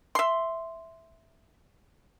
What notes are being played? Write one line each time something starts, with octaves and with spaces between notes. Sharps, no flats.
E5 C6